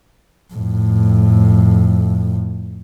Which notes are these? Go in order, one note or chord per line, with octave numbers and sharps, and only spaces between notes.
F2 A2